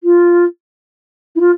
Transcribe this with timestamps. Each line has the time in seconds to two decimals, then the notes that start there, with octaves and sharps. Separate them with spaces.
0.03 F4
1.35 E4
1.40 F4